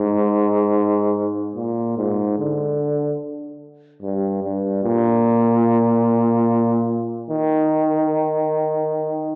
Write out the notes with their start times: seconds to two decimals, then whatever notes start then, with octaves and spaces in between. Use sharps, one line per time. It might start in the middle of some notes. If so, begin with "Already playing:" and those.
Already playing: G#2
1.56 A#2
1.97 G#2
2.39 D3
4.02 G2
4.43 G2
4.84 A#2
7.30 D#3